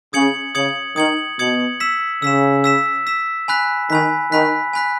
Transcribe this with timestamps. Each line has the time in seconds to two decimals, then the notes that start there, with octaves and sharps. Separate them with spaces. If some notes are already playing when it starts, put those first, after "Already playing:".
0.13 C#3 D#6 G#6 C#7 F#7
0.54 C#3 D#6 G#6 C#7 F#7
0.96 D#3 D#6 G#6 C#7 F#7
1.39 B2 D#6 G#6 C#7 F#7
1.80 E6 B6 E7
2.22 C#3 E6 B6 E7
2.64 E6 B6 E7
3.07 E6 B6 E7
3.48 G#5 B5 F#6 B6
3.90 D#3 G#5 B5 F#6 B6
4.32 D#3 G#5 B5 F#6 B6
4.73 G#5 B5 F#6 B6